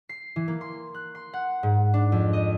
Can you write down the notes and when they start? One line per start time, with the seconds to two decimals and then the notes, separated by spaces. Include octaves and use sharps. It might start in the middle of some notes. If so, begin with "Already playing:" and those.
0.09 C7
0.36 E3
0.48 A#3
0.61 C6
0.94 F#6
1.15 C6
1.33 F#5
1.63 G#2
1.94 D4
2.12 F2
2.33 D#5